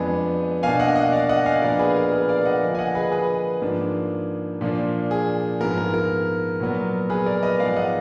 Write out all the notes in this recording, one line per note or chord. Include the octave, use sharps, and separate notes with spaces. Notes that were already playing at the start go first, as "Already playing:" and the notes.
Already playing: F2 F3 G#3 B3 D4 G#4 B4
B2 A#3 D4 F5 G#5
D#5 F#5
D#5 F#5
D5 F5
D#5 F#5
F5 G#5
A#2 F3 B3 D4 A#4 D5
G#4 B4
A#4
G#4 B4
D5 F5
D#5 F#5
D3 F3 A#3
G#5
D#5 F#5
G#4 B4
G#4 B4
G#2 F3 A#3 D4
A#2 F3 A#3 D4
G#4
G#2 F3 B3 A#4
A#4
A#4
A#2 F#3 B3
G#4 B4
A#4 D5
B4 D#5
G#2 F3 G#3 B3 D5 F5
D#5 F#5